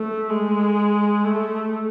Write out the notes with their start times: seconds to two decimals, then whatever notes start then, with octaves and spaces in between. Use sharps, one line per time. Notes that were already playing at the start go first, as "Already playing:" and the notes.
Already playing: A3
0.30 G#3
1.24 A3